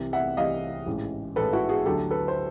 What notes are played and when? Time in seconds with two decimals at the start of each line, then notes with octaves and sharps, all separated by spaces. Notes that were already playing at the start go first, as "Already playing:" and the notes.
Already playing: C2 C3 E3
0.13 E5 F#5
0.37 C2 C3 E3 D#5 F5
0.86 A1 G#2 E3
1.36 A1 G#2 E3 A4 B4
1.53 E4 F#4
1.69 F#4 G#4
1.85 D2 D3 F#3 A3 G4 A4
2.11 A4 B4
2.28 C5